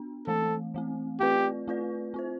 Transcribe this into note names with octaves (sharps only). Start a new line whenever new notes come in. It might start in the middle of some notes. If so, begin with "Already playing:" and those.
Already playing: B3 D4
E3 A3 C4 A4
E3 A3 C4
A3 C4 F4 G4 B4 D5
A3 C4 F4 B4 D5
C4 F4 C5